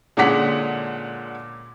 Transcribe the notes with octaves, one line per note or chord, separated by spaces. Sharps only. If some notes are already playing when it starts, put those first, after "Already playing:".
A#2 D3 G#3 C#4 F#5 B6